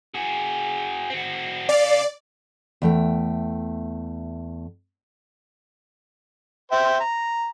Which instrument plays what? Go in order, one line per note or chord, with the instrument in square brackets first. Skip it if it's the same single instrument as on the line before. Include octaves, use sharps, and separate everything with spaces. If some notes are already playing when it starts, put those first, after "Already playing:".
[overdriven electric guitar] F#4 G#4
C4 F#4
[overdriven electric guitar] C#3 F5 [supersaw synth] D5
[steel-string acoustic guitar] E2 A3 G5
[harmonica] C5 E5 G5
A#5